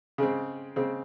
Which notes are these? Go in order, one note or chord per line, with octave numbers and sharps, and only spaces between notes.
C#3 G#3 C4
C#3 G#3 C4